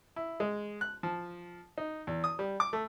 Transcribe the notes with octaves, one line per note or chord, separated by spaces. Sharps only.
E4
G#3
F#6
F3
D#4
E2
D#6
G3
D6
A3